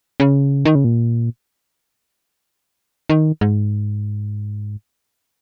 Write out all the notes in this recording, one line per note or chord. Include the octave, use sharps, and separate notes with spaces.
C#3
D#3
C#3
A#2
D#3
G#2